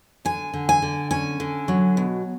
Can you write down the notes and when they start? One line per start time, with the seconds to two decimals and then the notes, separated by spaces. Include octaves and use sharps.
0.25 D3 G#5
0.54 D3
0.69 G#5
0.82 D3
1.11 C#4 G#5
1.40 D3
1.68 F#3
1.97 B2